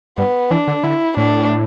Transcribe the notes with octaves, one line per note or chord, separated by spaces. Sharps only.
G2 B3
E3 D4
D3
D3 E4
A2 D4